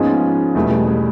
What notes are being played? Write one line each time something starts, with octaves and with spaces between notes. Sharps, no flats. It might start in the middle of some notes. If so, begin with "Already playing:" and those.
Already playing: G#2 F3 G#3 A#3 B3 C#4
E2 B2 G3 A3
G#3
G#3